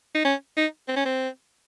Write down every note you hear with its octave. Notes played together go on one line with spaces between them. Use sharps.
D#4
C#4
D#4
C4
C#4
C4